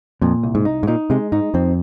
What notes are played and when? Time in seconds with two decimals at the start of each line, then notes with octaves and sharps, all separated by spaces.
0.22 F2 A#2
0.43 C2
0.55 G#2
0.65 D#4
0.83 G#2
0.87 A#2 D#4
1.10 C3 G#3
1.32 G#2 D#4
1.54 F2 C4